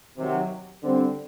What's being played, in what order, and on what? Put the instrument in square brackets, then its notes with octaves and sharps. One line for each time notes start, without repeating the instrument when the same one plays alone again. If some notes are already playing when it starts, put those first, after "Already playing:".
[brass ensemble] C3 D#3 F#3
D3 G3 C4